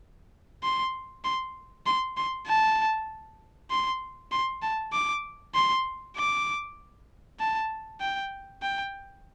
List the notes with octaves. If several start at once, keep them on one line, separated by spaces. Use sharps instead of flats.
C6
C6
C6
C6
A5
C6
C6
A5
D6
C6
D6
A5
G5
G5